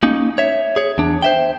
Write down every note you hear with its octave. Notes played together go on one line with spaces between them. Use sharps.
A#3 C#4 D#4
C#5 E5
G#4 C#5
E2 D4
C5 E5 G5